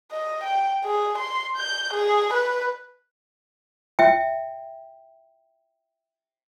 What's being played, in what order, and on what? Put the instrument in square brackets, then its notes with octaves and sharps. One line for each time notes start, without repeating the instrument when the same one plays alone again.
[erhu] D#5
G5
G#4
C6
G6
G#4
B4
[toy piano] E5 G5